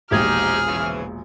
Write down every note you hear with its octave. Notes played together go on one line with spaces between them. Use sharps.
E1 A#1 D#4 G4 G#4 F6 G#6
C#3 E3